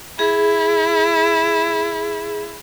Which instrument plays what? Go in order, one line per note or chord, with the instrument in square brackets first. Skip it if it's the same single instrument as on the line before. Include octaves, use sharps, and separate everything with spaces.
[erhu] E4 [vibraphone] G#4